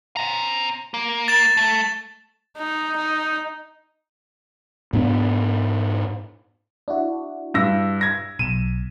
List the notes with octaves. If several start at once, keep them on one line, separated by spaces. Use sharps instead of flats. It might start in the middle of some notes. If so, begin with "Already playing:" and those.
C4 A#5
A#3
A6 E7
A3
D#4
D#4
G#2 B3 C4 D4
D4 E4 F#4
G2 E6 A#6
G#6 A#6
B1 D#7 E7